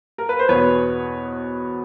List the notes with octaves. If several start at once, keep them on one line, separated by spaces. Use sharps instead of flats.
A#4
B4
C5
E2 B2 B4 C#5